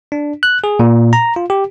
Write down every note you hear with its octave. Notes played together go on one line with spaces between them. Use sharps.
D4
F#6
G#4
A#2
A#5
F4
G4